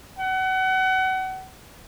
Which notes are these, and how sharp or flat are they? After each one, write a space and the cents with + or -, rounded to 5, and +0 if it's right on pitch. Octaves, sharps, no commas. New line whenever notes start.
F#5 +30